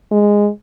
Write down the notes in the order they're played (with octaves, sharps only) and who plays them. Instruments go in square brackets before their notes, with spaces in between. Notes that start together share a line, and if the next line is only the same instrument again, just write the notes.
[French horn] G#3